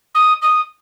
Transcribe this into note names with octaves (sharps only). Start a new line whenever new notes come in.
D#6
D#6